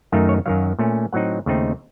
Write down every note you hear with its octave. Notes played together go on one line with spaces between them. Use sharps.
F#2 D#3 A3 D#4 F5
C#5
F#2 D#3 F#3 F5
A#2 A3 C#4
A2 F#3 C4 D#4 F#5
D#2 C#3 A3 C4 D#4